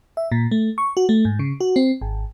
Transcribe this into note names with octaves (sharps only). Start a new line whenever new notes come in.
E5
A#2
A3
C#6
F#4
A3
G#2
C#3
F#4
C4
G#1